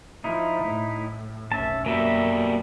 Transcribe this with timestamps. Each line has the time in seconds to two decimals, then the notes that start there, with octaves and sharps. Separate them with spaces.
0.24 F3 D#4 E4
0.66 A2
1.52 F1 B1 C#4 E5 A5
1.86 F#2 B2 G3 A#3 E5